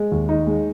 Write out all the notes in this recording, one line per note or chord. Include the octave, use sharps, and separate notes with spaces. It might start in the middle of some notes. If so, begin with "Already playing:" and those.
Already playing: G#3
D#2
D#4
G#3